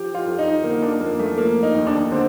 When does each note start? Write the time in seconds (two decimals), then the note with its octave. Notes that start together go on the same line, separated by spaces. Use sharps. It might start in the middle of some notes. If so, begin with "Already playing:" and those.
Already playing: F3 G4
0.14 F4
0.26 F2
0.39 D#4
0.63 D3 A#3
0.82 D4
1.00 F2 A#3
1.19 A3
1.38 F3 A#3
1.63 D#4
1.75 D#2
1.87 D4
2.12 D3 C4